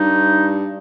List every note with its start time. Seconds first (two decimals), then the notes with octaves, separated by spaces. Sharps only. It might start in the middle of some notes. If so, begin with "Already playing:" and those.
Already playing: G2 D#4